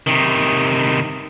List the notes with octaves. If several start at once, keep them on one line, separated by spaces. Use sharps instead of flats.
C3 D#3